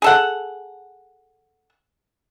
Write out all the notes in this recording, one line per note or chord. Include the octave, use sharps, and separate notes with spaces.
G#4 A4 F#5